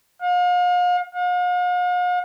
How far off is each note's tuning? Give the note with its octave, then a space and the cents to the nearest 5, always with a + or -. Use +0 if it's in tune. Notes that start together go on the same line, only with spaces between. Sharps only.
F5 +40
F5 +45